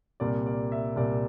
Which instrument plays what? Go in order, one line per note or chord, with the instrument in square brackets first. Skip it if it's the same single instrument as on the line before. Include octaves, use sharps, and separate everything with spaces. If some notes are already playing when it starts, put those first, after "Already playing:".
[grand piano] C2 A#2 G3 A#3 D5
D5
E5
C2 A#2 G3 A#3 D5